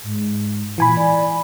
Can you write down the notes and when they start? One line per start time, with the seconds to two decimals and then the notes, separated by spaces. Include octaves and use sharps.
0.03 G#2
0.78 A#2 E3 G#5 B5
0.97 D5